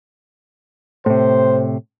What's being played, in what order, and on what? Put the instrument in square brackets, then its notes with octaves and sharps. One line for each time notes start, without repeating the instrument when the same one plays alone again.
[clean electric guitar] A2 C3 [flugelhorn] C5